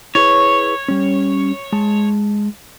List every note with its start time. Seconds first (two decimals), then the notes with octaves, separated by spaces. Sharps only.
0.15 E4 G#4 B4 C#5
0.88 G3 C#4
1.72 G#3 A5